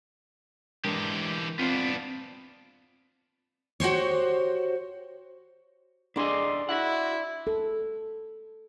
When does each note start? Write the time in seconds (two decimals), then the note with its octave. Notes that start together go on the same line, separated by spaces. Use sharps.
0.85 E3 G#3 D4 G4 A#4
1.59 B3 C4 D4 F4
3.80 F#4 G4 C5 C#5
6.16 D4 G#4 D5 D#5 C6
6.69 E4 F#4 F#5
7.47 A4